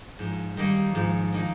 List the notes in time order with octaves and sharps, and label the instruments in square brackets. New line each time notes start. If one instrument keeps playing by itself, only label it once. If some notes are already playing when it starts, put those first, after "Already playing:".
[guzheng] G#2 [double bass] F3
[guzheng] D#3 A#3 D#4 [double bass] G3
[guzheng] G#2 [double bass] F3
[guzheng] D#3 A#3 D#4